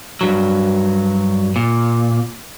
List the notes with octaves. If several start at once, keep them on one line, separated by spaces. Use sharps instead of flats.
G2 F#3
A#2